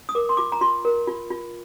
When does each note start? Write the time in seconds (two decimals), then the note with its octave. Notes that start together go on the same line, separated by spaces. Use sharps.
0.09 D#6
0.15 A#4 D6
0.29 C6
0.37 F4 D6
0.52 A#5
0.61 F4 C6
0.85 A#4
1.07 F4
1.30 F4